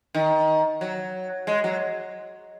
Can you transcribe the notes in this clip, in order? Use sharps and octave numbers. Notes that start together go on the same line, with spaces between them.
D#3
F#3
G#3
F#3